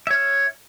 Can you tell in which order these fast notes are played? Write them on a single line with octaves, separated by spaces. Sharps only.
E5 C#5 F6